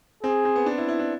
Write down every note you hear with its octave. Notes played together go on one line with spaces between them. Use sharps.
C4 G#4
C4
B3
D4
E4
E4
D4